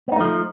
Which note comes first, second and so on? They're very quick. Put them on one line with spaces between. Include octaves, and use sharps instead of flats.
B3 D#4 A3 F3